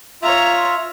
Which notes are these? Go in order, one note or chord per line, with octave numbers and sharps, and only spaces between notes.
F4 C#5 E5 A#5